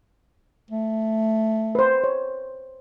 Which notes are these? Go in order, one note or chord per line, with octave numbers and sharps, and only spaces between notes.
A3
B4 C5
C#5